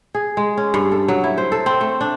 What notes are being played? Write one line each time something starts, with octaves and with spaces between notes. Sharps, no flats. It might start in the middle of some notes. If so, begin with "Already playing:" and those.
G#4
G#3
C#4
G2
A4
F#3
E4
C5
A4
C4
A3
D4